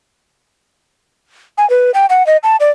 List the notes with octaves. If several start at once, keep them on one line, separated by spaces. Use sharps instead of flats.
G#5
B4
G5
F#5
D#5
A5
D5